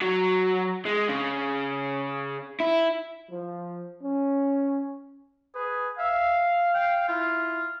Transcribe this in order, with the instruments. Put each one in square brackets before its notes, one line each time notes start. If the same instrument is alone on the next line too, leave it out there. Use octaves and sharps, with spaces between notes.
[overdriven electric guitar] F#3
G#3
C#3
E4
[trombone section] F3
C#4
[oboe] G#4 [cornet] B4
[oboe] E5 [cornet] F5
[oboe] G5
[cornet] E4 [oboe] F4